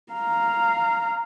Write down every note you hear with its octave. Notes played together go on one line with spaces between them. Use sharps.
F5 A#5